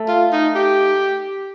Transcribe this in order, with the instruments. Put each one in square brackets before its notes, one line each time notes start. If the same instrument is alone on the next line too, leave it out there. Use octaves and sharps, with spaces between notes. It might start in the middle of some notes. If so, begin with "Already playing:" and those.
Already playing: [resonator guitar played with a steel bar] A3
[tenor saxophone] F4
D#4
G4